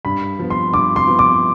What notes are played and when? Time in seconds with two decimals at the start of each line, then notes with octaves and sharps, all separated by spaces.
0.05 G2 B5
0.39 F3 B3
0.50 C6
0.73 G2 D6
0.96 C6
1.07 F3 B3
1.19 D6